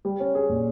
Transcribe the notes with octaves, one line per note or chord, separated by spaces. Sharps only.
G3
C#4
G#4
A#2